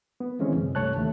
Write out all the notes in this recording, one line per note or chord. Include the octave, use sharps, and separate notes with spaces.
B3
D3 E3 G#3 C4 C#4
F#2 C3
C2 G2 A3 C#5 A5 F#6
D#2 D3 A3